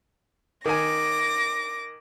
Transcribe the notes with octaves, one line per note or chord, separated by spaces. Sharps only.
D#3 G#5 D6 A#6